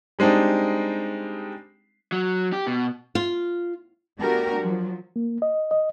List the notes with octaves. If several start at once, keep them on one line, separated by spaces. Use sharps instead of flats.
G3 G#3 C4 D4 D#4
F#3
G4
B2
F4
A3 B3 D4 F#4 G4 A#4
F3 F#3
A#3
D#5
D#5